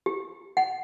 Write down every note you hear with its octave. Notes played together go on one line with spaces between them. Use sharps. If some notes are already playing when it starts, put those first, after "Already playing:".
G4
F#5